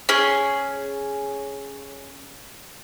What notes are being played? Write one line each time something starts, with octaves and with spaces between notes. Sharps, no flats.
C#4 G#4